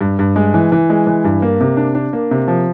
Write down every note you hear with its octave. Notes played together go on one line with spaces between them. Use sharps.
G2
G2
G#3
E3
E3
G#3
E3
G2
A#3
C3
D4
D4
A#3
C3
F3